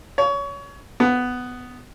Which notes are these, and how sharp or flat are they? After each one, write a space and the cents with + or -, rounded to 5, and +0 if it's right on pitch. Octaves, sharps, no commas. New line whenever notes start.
C#5 +25
B3 +10